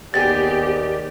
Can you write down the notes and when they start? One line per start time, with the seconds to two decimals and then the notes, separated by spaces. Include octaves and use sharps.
0.14 D#2 D#3 B3 C4 G4 G#4 D5 A6